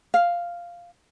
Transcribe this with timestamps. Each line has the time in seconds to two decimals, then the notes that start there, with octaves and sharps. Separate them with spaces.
0.14 F5